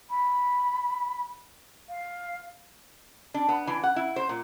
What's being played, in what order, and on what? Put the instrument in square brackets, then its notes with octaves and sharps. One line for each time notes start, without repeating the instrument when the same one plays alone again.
[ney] B5
F5
[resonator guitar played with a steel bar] D4
B3
E3
F#5
E4
C5
A#2